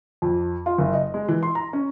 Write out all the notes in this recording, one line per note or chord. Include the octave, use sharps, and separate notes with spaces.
F2
F4
F#1
D#5
G#3
E3
C6
A#5
C#4